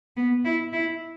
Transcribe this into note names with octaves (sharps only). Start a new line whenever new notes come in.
B3
E4
E4